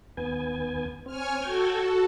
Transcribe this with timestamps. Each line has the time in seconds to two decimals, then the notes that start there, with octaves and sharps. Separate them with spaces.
0.17 D#2 B3 G#5
1.06 C4 C#5 G#5 F6
1.43 F#4 A4 G5 G#6